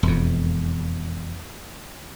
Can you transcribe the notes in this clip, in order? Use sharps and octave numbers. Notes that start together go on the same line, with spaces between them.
E1 F2